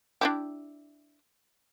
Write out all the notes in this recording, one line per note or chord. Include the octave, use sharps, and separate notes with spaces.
D4 E4 G4